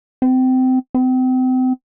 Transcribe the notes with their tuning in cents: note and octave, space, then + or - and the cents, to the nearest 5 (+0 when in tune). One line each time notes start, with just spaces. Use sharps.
C4 -25
C4 -35